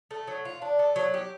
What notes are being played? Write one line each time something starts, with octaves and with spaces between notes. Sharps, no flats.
A3
F#3
F4
D4
A3
F#3
G4